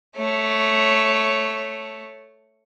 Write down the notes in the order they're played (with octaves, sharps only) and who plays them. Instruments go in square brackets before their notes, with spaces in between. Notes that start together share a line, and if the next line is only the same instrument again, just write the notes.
[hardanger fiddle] A3 C#5